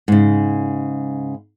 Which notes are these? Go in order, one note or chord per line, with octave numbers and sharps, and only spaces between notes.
G#2 C#3